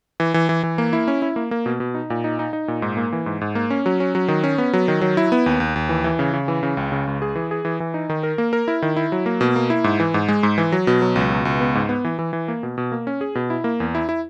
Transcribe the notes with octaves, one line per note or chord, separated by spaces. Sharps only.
E3
E3
E3
E3
A#3
E4
C#4
E4
A#3
A#3
B2
B2
D#4
A#2
D#4
D#4
D#4
A#2
G#2
A#3
E3
G#2
G#2
A#3
C#4
F#3
C#4
F#3
D#3
C#4
B3
F#3
D#3
F#3
E4
B3
D#2
D#2
D#2
E3
E3
C#3
C#3
E3
C#3
C#2
C#3
C#2
G#4
E3
G#4
E3
E3
D#4
D#3
A#4
A#3
A#4
E4
D#3
E4
F#3
A#3
B2
A#3
E4
G#2
E3
G#2
G#3
G#2
E3
F#3
B2
F#3
C#2
B2
C#2
B3
G#2
B3
E3
E3
E3
A#3
B2
B2
A#3
C#4
G#4
B2
E4
A#3
E2
E4
E4